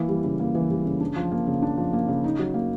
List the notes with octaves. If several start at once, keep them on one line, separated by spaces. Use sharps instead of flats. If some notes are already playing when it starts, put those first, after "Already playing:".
Already playing: E3 A#3
G3
C#3
A#3
E3
G3
C#3
D4
F3
A#3
C#3
D4
F3
A#3
C#3
D#4
F#3
A#3